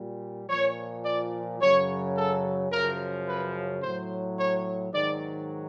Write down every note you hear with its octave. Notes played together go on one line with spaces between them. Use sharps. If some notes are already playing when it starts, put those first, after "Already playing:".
Already playing: A#2 G3
A#2 F3 C#5
D5
F#2 C#3 F#3 C#5
A4
F#2 C#3 F3 A#4
B4
A2 F#3 C5
C#5
G#2 D#3 F#3 D5